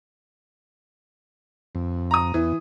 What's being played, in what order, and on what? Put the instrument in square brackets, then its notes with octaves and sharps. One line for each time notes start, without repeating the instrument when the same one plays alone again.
[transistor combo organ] F2
[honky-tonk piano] A#5 D#6
[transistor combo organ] E2 [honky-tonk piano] E3